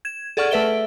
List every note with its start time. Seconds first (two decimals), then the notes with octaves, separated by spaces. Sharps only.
0.05 G#6 E7
0.37 G#4 A4 D5 F#5 C#6 F6
0.51 A3 A4 B4 E5 D7 G7